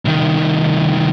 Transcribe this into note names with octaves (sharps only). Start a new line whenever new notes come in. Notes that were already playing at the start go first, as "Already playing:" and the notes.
C2 D#3